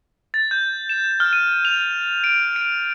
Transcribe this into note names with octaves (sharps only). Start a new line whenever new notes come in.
A6
G6
E7
F6
D#7
F7
D7
D7